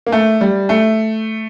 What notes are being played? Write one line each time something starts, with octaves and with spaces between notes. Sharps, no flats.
A#3
A3
G3
A3